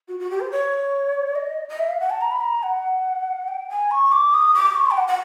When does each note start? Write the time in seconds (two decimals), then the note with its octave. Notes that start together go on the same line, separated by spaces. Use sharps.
0.08 F#4
0.19 F#4
0.30 G4
0.40 C5
0.51 C#5
1.35 D#5
1.69 D#5
1.79 E5
1.89 F5
2.00 F#5
2.10 A5
2.21 A#5
2.31 B5
2.40 A#5
2.63 F#5
3.48 G5
3.70 G#5
3.91 C#6
4.12 D6
4.33 D#6
4.54 D6
4.75 C#6
4.86 C6
4.91 G5
4.97 F#5
5.07 F#5